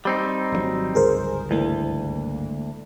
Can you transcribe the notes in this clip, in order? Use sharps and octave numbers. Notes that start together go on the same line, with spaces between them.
G3 C4 D#4
G#1 D3 F#3
G1 C#2 G#2 G#4 A#4 C5
D2 E3 G#3 A#3